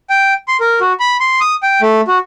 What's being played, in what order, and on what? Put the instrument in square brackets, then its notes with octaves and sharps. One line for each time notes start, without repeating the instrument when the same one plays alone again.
[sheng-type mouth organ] G5
C6
A#4
F#4
B5
C6
D#6
G5
A3
F#4